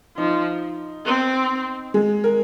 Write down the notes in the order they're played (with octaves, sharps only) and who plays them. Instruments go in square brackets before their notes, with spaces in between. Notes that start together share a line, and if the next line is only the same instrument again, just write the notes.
[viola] F3 [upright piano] D#4
[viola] C4
[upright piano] G#3
A#4